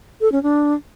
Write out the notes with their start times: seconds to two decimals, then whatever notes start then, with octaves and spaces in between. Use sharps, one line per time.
0.21 A4
0.32 C#4
0.43 D4